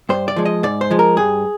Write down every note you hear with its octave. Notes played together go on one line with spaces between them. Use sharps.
G2 C5
D5
F3 G#3
D#5
G#2 D5
C5
F3 G#3
A#4
G2 G#4